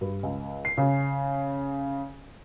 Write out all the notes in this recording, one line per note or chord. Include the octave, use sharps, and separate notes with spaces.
G2
C#2
C7
C#3